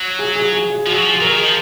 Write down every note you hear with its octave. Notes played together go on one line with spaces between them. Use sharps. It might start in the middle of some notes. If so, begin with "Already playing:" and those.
Already playing: F#3
G#4
G#4
G#4
G#4
F3 F#4
F#3
F3
G#4
F#3 A#4
D#3 G#4
F3